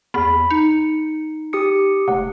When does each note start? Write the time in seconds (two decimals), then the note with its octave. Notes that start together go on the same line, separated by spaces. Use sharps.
0.14 E2 B5
0.50 D#4 C#7
1.53 G4 D#6 C#7
2.08 F1 F#5